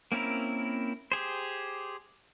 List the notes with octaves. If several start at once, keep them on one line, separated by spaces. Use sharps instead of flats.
A#3 C4 C#4 E4 A#4
G4 G#4 C5